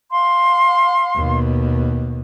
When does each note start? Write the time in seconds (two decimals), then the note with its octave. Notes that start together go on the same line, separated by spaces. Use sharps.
0.11 F5 C6
1.16 D#2 B2